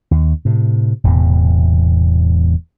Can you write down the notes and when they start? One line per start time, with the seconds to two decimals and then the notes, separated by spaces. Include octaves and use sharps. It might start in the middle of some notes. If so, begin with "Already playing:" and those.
0.11 D#2
0.45 A2 C3
1.04 E1 E2 A2 C3